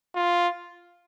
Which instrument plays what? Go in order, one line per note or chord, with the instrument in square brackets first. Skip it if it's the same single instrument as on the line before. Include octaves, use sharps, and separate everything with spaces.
[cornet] F4